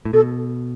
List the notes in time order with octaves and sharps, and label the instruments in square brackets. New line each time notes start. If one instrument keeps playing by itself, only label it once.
[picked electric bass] A2
[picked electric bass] B2 [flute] A4